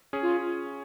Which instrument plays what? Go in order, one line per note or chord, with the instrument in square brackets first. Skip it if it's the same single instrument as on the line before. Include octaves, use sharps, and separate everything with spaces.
[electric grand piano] C#4 G#4
[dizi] F4